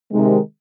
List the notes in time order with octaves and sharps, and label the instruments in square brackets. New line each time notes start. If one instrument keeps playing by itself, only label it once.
[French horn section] C3 D#3 G#3